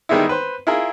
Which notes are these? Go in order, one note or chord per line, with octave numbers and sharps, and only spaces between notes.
D#3 G3 G#3 B3 D#4 E4
B4 C5
E4 F4 G#4 A#4